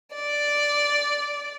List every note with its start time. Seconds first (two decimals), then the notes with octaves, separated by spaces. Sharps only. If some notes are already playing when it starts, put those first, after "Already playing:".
0.14 D5